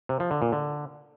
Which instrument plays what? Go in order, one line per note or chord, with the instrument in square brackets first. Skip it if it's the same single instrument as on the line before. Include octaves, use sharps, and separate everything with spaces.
[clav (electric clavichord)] C3
F3
D3
A#2
D3